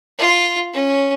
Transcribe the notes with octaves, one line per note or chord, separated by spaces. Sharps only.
F4
C#4